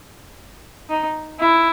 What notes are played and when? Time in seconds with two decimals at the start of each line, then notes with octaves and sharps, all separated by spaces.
0.90 D#4
1.40 E4